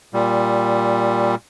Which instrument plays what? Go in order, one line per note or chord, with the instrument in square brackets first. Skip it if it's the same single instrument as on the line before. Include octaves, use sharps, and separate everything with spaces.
[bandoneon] A#2 G3